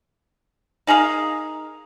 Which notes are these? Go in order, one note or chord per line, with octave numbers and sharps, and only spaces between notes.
D#4 G#4 A#4 F5